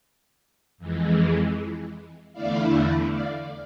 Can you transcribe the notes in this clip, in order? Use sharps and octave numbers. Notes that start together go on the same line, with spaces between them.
F2 E3 G#3
E2 D3 A3 E4 D5 F5
D5 F5